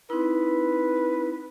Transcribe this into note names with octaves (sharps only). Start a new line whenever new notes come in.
C4 D#4 E4 B4